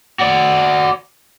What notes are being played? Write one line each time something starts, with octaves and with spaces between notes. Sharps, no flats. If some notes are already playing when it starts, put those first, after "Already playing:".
F#4 D5